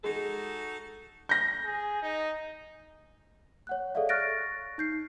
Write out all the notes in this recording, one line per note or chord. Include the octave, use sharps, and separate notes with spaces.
G#3 D#4 F#4 A4
G6 A#6
G#4
D#4
C#5 F#5 F#6
G#4 A4 C#5 D5 E5 F5
C#6 F6 F#6 A6 A#6 D7
D#4 G6 C7